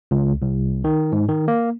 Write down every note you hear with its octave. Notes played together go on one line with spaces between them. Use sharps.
C#2
C2
D#3
G#2
D#3
A#3